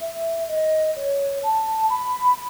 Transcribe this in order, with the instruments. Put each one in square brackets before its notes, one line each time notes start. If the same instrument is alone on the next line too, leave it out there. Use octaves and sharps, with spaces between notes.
[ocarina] E5
D#5
C#5
A5
B5